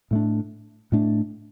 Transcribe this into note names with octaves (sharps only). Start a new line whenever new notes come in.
A2 A3 D4
A2 A3 D4